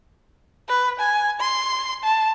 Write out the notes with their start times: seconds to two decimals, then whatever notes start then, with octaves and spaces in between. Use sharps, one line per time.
0.68 B4
1.00 G#5
1.40 C6
2.04 A5